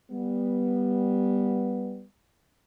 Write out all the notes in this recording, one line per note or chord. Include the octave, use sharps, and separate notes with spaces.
G3 B3